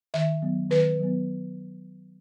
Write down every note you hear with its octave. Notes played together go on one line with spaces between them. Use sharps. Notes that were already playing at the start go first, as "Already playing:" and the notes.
D#3 E5
F#3 B3
D#3 B4
F#3 B3